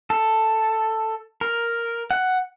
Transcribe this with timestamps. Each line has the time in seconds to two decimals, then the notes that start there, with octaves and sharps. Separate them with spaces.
0.10 A4
1.41 A#4
2.11 F#5